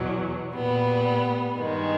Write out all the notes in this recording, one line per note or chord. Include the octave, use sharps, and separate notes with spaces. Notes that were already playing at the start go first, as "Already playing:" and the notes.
Already playing: E2 B2 F#3
A#2 G3 B3
G2 D#3 G#3